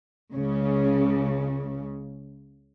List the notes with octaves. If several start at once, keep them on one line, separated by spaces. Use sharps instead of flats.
C#2 C#3